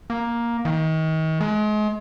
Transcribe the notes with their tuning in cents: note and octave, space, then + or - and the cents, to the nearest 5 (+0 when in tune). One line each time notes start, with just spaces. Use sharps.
A#3 +10
D#3 +35
G#3 +35